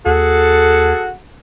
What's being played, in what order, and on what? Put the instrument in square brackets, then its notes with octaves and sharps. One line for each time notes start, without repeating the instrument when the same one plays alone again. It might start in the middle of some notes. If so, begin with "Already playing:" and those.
[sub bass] D#2 [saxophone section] F#4 G#4 A4